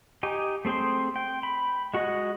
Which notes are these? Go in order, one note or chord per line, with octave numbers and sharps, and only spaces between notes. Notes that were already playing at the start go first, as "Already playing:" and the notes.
D#4 G4 G#5 D6
A3 C4 G#4 G5 C6
G5
B5
G#3 F#4 G#4 D#5 F#5